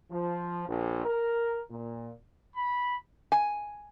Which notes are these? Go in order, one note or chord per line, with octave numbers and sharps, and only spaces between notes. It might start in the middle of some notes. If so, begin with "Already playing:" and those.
F3
A#1
A#4
A#2
B5
G#5